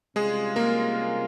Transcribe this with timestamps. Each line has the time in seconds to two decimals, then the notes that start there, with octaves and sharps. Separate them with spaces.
0.16 C3 G3 G#3 C#4 F4 G#4
0.56 A#3 A#4